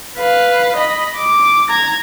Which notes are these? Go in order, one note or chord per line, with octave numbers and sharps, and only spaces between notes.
B4 F5
D#5 B5
D6
A#5 G#6